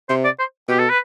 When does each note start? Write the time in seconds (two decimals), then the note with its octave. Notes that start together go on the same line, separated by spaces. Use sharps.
0.09 C3 C5
0.24 D5
0.39 C5
0.68 B2 G4
0.79 A4
0.89 B4